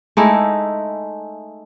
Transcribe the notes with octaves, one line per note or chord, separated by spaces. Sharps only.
G#3 A3 D#4 E4